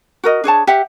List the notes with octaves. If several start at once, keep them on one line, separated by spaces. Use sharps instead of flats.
F#4 A#4 D#5
D4 G#4 C#5 A5
G4 E5 F#5